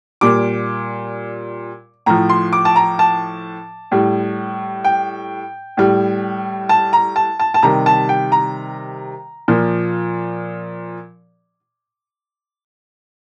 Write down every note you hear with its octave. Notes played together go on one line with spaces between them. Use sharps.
A#2 G3 D6
A2 F3 A#5
C6
D6
A5
A#5
A5
A2 G3
G5
A2 G3
A5
A#5
A5
A5
A5
C3 D#3 G3 A#5
A5
G5
A#5
A#2 F3